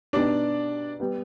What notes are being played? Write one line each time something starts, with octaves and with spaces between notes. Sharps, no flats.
B2 B3 D4 D#4 G4 D5
G3 B3